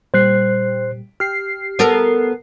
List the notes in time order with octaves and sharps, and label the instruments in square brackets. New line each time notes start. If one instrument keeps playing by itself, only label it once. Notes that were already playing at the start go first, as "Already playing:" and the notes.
[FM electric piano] A#2 G3 [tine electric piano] C5 F#6 C7
[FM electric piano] G4 C7 [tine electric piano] F6
[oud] B3 A4 A#4